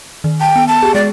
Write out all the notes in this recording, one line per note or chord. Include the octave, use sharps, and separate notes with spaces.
D#3
G5 A5
B3
A5
G4 G#4
G#3 D5